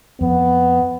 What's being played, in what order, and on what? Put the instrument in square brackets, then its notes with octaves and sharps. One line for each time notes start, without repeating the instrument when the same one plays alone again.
[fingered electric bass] F2 [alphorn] B3